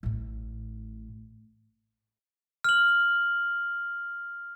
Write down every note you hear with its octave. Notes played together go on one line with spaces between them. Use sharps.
A1 A2
F6 F#7